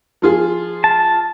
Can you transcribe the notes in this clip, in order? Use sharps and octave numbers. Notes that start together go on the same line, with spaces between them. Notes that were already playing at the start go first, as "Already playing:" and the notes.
F3 F4 G#4
A5